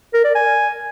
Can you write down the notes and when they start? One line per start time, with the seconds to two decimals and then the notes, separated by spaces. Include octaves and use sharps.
0.14 A#4
0.24 D5
0.35 G#5